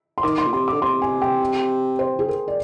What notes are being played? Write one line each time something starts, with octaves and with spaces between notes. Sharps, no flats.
C6
D#3 D6
C6
A#2
C3 C6
D3 D6
C3 C6
G#5
G5
C5
G#4
A#4
D5